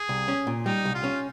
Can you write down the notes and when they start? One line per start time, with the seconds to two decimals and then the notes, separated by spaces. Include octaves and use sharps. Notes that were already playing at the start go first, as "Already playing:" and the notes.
Already playing: G#4
0.09 C2
0.28 C#4
0.47 A#2
0.66 G3 D#4
0.85 C2
0.95 F4
1.04 C#4